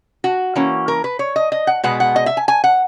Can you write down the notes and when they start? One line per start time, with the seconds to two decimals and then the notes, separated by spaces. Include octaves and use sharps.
0.24 F#4
0.55 E3 A#3 C#4
0.88 A#4
1.04 B4
1.19 C#5
1.36 D#5
1.52 D#5
1.67 F#5
1.84 B2 G#3 B3 F#5
2.00 F#5
2.16 D#5
2.26 E5
2.37 G#5
2.48 G#5
2.64 F#5